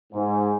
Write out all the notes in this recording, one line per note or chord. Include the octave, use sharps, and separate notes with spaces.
G#2